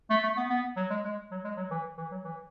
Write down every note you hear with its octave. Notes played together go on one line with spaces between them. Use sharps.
A3
A3
B3
B3
F#3
G#3
G#3
F#3
G#3
F#3
E3
E3
F#3
E3